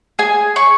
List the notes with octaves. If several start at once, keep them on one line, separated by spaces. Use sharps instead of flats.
G#4 G#5
C#5 C#6